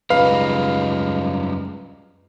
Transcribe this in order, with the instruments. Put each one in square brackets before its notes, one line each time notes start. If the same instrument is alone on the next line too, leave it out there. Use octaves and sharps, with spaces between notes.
[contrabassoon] C#2 [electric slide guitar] F#2 G3 D#4 [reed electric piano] B4 [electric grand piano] F5